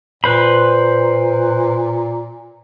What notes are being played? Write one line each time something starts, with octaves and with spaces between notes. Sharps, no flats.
A#2 B4 C5 B5